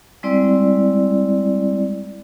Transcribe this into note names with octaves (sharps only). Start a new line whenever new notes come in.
G3 G#3 C4 E4 D5